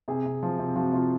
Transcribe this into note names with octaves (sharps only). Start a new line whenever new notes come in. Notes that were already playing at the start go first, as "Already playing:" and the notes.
C3 G#4
C3
F3
C3
F3 F#4
C3 F4